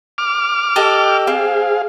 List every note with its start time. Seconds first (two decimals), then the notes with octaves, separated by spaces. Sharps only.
0.18 D6 F6
0.76 G4 A4 D#5
1.27 C4 G#4 F5